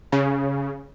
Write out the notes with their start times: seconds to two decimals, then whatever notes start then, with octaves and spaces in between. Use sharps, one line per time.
0.12 C#3